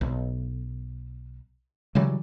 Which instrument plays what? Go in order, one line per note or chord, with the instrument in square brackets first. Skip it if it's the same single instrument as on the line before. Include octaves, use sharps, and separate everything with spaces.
[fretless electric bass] B1
C#3 E3 F#3 G3